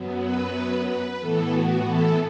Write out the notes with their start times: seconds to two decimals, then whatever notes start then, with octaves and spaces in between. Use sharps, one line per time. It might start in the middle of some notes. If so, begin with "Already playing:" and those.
Already playing: F#2 F#3 B3
0.22 B4
0.86 B4
1.19 A2 E3 B3 A4
1.50 F#4
1.82 A4